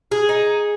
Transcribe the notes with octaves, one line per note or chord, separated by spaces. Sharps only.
G#4
D#4